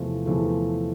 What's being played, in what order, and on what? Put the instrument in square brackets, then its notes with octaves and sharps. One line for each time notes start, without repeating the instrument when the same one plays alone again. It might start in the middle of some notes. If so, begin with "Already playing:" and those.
Already playing: [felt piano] E2 C3 F3 A3
E2 C3 F3 A3